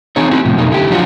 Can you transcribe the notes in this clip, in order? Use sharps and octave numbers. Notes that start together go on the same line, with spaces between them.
E3 C4 D#4 G#4 C#5
C4 E4 F#4
A2 C3 F3
F2 B2 F#3 A#3 D#4
D3 E4 G4
F3 F#3 D4 F4 F#4